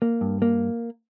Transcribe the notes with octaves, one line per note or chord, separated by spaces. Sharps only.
A#3
G2
A#3